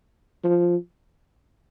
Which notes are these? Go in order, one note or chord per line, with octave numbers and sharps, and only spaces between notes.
F3